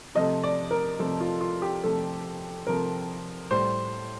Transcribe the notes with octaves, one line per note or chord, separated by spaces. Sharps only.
C3 F3 A3 D#5
D5
A#4
C3 F3 A3 A4
F4
F4
G4
C3 F3 A3 A4
C3 F3 A3 A#4
A2 G3 C5